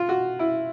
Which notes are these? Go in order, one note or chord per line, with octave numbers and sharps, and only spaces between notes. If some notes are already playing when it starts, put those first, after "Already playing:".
Already playing: F4
F#4
E4